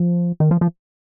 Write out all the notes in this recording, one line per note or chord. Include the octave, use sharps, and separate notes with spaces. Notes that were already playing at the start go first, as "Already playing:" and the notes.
Already playing: F3
D#3
F3
F3